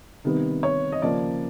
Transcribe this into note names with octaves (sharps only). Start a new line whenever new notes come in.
C3 D#3 G3 B3
C#5
D#5
C#3 F3 A#3 D5